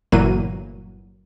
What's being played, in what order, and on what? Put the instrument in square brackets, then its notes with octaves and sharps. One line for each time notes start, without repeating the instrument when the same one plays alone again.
[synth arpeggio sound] G1 A#2 E3 F#3 A#3 D#7